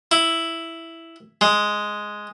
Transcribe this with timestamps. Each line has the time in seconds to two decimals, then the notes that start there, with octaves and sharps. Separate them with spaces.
0.11 E4
1.41 G#3